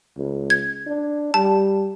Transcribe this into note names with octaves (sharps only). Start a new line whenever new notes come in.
C#2
G#6
D4
G3 A5